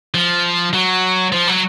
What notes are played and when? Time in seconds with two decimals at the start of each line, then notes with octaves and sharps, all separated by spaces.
0.14 F3
0.73 F#3
1.32 F3
1.48 F#3